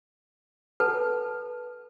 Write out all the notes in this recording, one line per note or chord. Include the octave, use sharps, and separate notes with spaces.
A4 B4 A5